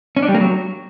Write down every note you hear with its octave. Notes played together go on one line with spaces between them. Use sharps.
C#4
D4
G3
A#3
F#3